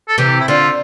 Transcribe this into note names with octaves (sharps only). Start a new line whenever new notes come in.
A4
C3 E3 G4
E4
D3 F4